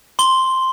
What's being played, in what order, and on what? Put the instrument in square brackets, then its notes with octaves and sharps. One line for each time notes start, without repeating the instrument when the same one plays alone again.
[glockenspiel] C6 G7